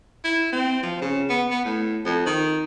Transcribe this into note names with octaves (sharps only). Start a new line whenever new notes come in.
E4
C4
F3
C#3
B3
B3
A2
F2
D#3